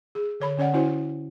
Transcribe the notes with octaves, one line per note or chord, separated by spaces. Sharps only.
G#4
D3 C#5 B5
D3 C#4 C#5 D5 F#5
C#4 E4 F#4 C5